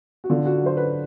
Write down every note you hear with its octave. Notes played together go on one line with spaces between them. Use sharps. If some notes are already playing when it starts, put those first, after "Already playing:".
F#4
D3 F4
F#4
F#3 C5
B4